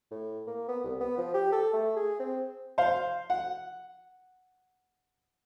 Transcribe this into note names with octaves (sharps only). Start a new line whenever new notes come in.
A2
A#3
B3
C2
B3
F3
G4
A4
A3
G#4
C4
C5 F5
F#5